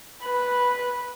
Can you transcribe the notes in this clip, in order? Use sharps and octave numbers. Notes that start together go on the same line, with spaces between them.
B4